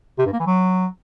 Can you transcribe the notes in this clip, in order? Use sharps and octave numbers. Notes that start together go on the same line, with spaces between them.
C3
G2
A#3
E3
F#3